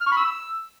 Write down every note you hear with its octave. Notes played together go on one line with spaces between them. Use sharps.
F6
C#6
B5
E6